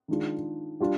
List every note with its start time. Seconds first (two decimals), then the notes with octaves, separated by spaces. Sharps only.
0.08 D#3 G#3 D4 F4
0.80 G3 D4 F4